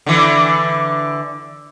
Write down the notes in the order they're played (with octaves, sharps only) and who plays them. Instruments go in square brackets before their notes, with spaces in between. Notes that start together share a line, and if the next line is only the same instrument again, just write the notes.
[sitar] D3 E3